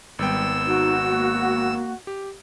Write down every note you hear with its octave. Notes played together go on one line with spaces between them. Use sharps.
G#1 G3 B3 G5 E6
D#4 F#4
A#3
G4